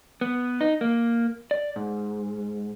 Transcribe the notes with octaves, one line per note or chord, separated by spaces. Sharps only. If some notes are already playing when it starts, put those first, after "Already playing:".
B3
D#4
A#3
D5
G#2